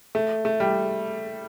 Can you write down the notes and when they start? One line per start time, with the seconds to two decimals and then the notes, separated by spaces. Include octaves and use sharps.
0.15 A3
0.45 A3
0.60 G3